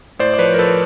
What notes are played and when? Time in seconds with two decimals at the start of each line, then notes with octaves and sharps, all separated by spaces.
0.19 A2 C5 D5
0.34 D5
0.39 F3 B4 C#5
0.54 A#4
0.59 F3 A4 B4